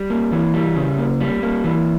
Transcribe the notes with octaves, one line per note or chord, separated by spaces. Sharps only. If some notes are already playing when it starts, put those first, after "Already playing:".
Already playing: G3
A#3
E3
G3
C#3
A#3
G3
A#3
E3